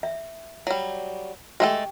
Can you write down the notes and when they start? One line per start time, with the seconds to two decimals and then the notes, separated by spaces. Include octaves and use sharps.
0.03 E5
0.67 F#3 G3
1.60 G#3 A3 G4 A4 G5